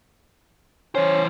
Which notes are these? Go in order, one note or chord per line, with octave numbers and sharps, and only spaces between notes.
E3 C#4 C5